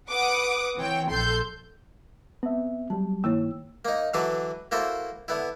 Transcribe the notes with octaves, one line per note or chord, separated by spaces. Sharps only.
B4 F#5 D6 D#6
E3 C4 C#5 G5
A#1 A4 C6 G6
B3 C4 E5
F#3 G3 A5
G2 D#3 A#3 E4 C#5 E6
A#3 D#4
D3 E3 F#3 D4 F#4 B4
A#3 E4 F#4 A4 C5
D3 B3 E4